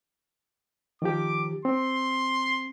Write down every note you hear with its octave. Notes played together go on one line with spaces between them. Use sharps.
D#3 F3 G4 D6
C4 C6